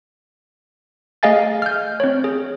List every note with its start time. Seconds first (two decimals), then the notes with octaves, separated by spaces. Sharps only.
1.23 A3 G#4 D#5 F5 G#5 A6
1.62 F6 G6
2.00 C4 C#5
2.24 G#4